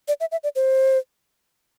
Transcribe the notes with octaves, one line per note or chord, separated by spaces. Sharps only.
D5
E5
E5
D5
C5